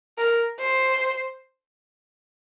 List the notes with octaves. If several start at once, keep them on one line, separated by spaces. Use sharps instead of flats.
A#4
C5